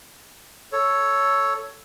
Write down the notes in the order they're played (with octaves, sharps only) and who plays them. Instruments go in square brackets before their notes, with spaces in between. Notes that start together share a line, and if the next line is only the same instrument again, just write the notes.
[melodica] A4 C#5